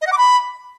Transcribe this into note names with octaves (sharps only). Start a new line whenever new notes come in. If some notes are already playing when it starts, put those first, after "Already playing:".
D#5
F#5
D6
B5